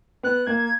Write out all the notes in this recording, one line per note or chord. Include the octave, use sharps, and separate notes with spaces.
B3 F#6
A#3 G#6